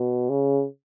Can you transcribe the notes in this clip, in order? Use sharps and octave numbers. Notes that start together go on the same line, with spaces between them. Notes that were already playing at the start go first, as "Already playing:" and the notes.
Already playing: B2
C#3